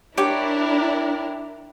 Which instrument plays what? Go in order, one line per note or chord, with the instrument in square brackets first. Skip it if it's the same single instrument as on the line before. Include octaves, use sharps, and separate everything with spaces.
[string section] D4 E4 A#4 [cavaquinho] G4 C#5 D6